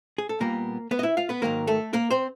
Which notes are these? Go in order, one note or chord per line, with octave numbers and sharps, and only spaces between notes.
G#4
A4
A#2 G3 A#3 B3 A#4
B3 B4
D#5
E4 E5
F4 F5
B3 B4
G#2 D#3 F#3 A#3 A#4
A3 A4
A#3 A#4
C4 C5